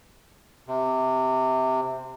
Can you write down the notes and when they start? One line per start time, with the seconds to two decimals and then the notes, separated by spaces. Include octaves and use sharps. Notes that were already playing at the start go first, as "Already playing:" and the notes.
0.68 C3